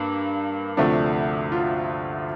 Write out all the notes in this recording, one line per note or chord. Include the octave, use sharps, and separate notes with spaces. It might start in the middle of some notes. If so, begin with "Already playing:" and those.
Already playing: G2 A#3
D2 C3 F3 A3 D4
F4